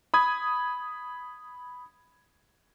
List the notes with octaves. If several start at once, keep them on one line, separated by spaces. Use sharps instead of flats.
B5 D#6 G#6